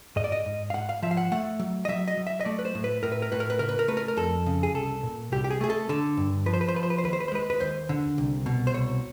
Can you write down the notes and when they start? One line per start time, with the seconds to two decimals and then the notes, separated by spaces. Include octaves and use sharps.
0.16 G#2 D#5
0.24 D5
0.32 D#5
0.46 G#2
0.70 F5
0.74 G#2 F#5
0.89 F5
1.03 F3 E5
1.11 F5
1.17 F#5
1.32 A3 F#5
1.59 F#3
1.85 D#5
1.88 F#3 E5
2.08 D#5
2.17 F#3
2.27 E5
2.41 D#5
2.45 A3 D5
2.59 B4
2.65 C5
2.75 A2
2.84 B4
3.03 A2 A#4
3.12 B4
3.22 A#4
3.32 A2 B4
3.40 A#4
3.50 B4
3.59 C#3 A#4
3.69 B4
3.79 A#4
3.88 A3 B4
3.97 A#4
4.08 A#4
4.17 F2 A4
4.47 C#3
4.63 G#4
4.74 C2 A4
5.03 A#2
5.32 C2 G4
5.44 G4
5.50 G#4
5.61 A3 G#4
5.70 A4
5.89 D3 A4
6.17 G2
6.46 F3 B4
6.53 C5
6.61 B4
6.68 C5
6.74 F3 B4
6.83 C5
6.90 B4
6.98 C5
7.04 D#2 B4
7.13 C5
7.20 B4
7.28 C5
7.32 G#3 B4
7.50 B4
7.60 D#2 C5
7.89 D3
8.18 C2
8.46 B2
8.67 C5
8.74 C2 C#5